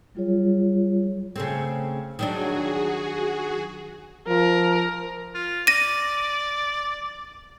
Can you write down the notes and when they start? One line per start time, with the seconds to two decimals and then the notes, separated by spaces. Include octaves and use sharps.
0.15 F#3 G3 F4 G#4 C#5
1.36 C#3 A3 C4
2.19 D#3 F#3 D4 F#4 G#4
4.28 F3 A#4
5.34 F4
5.67 D5 A#6 D#7